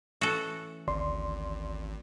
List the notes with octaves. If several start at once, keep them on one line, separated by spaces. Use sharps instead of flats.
E3 A3 C#4 F#4 A4
G#1 D2 D5 C6